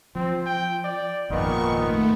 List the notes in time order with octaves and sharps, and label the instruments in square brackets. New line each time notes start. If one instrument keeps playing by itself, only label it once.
[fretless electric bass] F3 [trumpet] C4
[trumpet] G5
D5
[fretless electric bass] G#1 F2 [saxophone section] A#2 D#3 [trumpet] B3 [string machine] C#6
[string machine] A3 [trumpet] B3